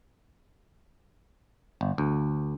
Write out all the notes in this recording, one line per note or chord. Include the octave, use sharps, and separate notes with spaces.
G1
D2